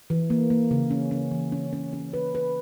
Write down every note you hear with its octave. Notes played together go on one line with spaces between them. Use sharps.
E3
A#3
A#3
C#3
C#4
C#4
E3
C#4
C#4
C#4
B4
B4